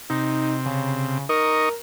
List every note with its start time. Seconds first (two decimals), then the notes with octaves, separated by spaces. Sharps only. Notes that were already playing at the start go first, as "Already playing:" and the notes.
0.10 C3 D#4
0.66 C#3
1.29 D#4 A#4 D#5 C#6